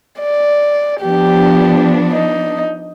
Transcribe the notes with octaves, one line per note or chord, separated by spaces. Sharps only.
D5
F3 B3 D4 G4
D#4